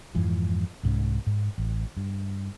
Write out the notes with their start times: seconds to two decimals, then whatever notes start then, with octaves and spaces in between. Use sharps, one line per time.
0.15 F2 G#2 E3 F3
0.83 C2 G#2 E3 C#4
1.27 G#2
1.58 A1
1.97 G2